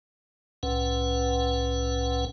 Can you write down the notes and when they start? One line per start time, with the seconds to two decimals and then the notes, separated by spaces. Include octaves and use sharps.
0.63 C2 A2 C#4 B4 F#5